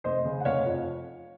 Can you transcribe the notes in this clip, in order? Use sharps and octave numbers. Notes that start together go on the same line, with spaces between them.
F1 C5 D#5
C#3
F#5
F1 C#5 F5
F2